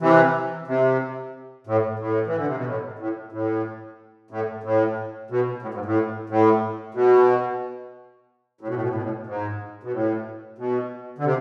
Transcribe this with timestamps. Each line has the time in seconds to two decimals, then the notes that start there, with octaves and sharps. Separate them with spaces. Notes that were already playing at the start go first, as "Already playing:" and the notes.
0.01 C3 E3
0.68 C3
1.67 A2
1.99 A2
2.27 E3
2.37 D3
2.46 C3
2.56 B2
2.66 A2
2.99 A2
3.32 A2
4.31 A2
4.63 A2
5.30 B2
5.62 A2
5.74 G#2
5.85 A2
6.29 A2
6.94 B2
8.61 A2
8.68 B2
8.74 A2
8.81 B2
8.89 A2
8.95 B2
9.02 A2
9.27 G#2
9.83 B2
9.93 A2
10.58 B2
11.18 D3
11.25 C3